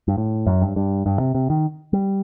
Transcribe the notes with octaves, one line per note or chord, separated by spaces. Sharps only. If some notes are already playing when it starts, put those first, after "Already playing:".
G2
A2
F#2
G2
G2
G2
C3
C3
D#3
G3